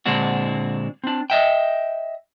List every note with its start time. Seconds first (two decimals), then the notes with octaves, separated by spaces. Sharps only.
0.06 A#2 D3 G#3 C4 D4 F#4
1.04 C4 D4
1.30 D#5 E5 G5